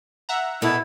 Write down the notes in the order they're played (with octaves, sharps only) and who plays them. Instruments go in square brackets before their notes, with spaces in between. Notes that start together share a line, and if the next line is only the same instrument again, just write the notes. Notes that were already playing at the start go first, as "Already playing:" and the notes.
[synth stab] E5 F#5 A#5
[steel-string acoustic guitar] B2 B3 A4 [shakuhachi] E4